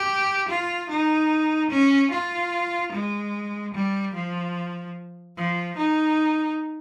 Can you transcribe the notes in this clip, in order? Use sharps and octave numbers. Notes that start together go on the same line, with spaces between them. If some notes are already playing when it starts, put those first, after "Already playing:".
Already playing: G4
F4
D#4
C#4
F4
G#3
G3
F3
F3
D#4